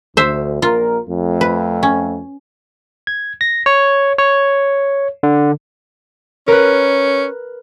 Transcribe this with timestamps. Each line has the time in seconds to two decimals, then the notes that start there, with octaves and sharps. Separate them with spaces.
0.17 D2 C5 E5
0.62 A#1 A#2 F4 A#4
1.10 F2 A3
1.41 B4
1.83 C#4
3.07 G#6
3.41 A#6
3.66 C#5
4.18 C#5
5.23 D3
6.48 C#4 A#4 B4